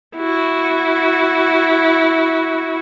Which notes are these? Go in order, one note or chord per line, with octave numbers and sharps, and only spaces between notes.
E4 F#4